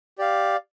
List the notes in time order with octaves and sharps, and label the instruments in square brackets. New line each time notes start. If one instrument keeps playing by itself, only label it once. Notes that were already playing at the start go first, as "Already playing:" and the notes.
[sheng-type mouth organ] G4 D5 F5